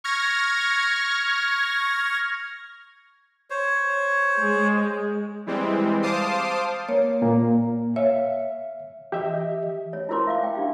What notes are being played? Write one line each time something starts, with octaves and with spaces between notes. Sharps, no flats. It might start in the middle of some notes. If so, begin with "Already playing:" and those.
C#6 F6 G#6 A#6
C5 C#5
G#3
E3 G3 G#3 C4
C5 F5 A5 D6 D#6 C7
A#3 C#5
A#2 A#3
C#5 E5 F5
E3 G4 D#5 E5
C#5
E4 F4 A#4 C5 C6 D6
E5 F5 D6
G5
D4 G4 F5